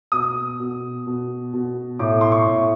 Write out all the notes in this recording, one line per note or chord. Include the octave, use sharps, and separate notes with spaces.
B2 D#6
B2
B2
B2
A2 D6
C6
C#6
A2